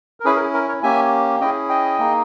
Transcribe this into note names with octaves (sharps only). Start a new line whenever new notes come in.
A#4
C#4 E4 G#4 B4
A#4
G#4
A#4
A#4 C#5
A#3 C#4 G4 E5 G#5
C#4 E4 G#4 D#5 G5
D#5 G5
A#3 D#4 G#4